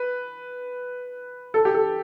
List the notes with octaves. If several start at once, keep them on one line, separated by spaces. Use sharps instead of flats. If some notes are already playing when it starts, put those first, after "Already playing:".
Already playing: B4
A4
G4
A4